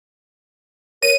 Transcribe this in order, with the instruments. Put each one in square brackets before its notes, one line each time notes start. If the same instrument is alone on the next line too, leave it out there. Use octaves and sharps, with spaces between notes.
[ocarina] A#4 [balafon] C#5 [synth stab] D#7